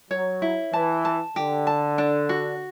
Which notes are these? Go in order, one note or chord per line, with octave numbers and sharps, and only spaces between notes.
F#3 C#5
E4
E3 A5
A5
D3 G4
A5
D4
F#4